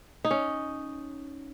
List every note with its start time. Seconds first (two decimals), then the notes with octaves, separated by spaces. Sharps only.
0.25 D#4
0.31 C#4